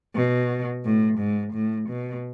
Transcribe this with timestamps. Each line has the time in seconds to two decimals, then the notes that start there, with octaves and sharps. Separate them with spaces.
0.15 B2
0.85 A2
1.19 G#2
1.54 A2
1.89 B2